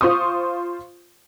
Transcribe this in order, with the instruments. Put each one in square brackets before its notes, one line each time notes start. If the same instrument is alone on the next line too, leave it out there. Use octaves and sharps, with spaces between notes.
[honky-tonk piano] F4 C5 C6 C#6 D#6